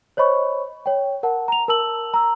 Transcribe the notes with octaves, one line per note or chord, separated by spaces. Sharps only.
C5 C#5 D#5 B5 C#6
C#5 G5
A#4 F#5 A5
A#5 F7
A#4 A5 E6 F#7
A#5 E6